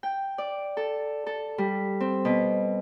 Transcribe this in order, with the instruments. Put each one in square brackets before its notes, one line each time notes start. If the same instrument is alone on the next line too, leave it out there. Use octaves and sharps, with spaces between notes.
[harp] G5
D5
A4
A4
G3
C4
B2